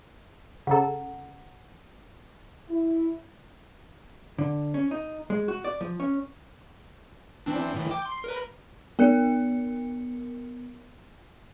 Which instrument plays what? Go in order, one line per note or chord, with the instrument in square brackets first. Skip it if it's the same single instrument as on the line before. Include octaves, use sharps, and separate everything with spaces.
[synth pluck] C#3 A4 [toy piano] F#5 A#5
[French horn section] E4
[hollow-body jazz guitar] D3
C#4
D#4
G#3
F#4
D5
F3
C#4
[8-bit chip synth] E3 C4 D4
A2 D#3 E3
G5 D6
C6
A#4 B4
[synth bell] B3 A#4 C#7